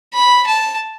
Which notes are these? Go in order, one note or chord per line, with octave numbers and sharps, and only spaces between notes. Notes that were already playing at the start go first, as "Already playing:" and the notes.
B5
A5